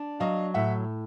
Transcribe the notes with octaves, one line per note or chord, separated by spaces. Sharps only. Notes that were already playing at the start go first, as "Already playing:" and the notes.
Already playing: D4
F#3 D#5 F5
A2 E5 F#5